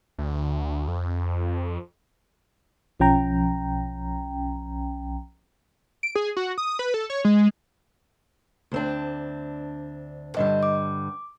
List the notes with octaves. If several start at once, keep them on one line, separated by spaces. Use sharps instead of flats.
D2
F2
B1 F3 C#4 G5 A#5
D7
G#4
F#4
D#6
B4
A4
C#5
G#3
D2 C4 D4
G2 D3 G3 D#5
D6